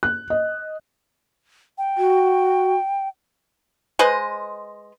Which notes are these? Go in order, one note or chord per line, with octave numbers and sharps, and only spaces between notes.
F#6
D#5
G5
F#4
G#3 B4 C5 D#5